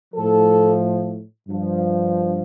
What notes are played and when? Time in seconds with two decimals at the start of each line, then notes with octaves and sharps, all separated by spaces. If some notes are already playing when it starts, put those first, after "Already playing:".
0.14 A2 F3 A4
1.48 G2 F3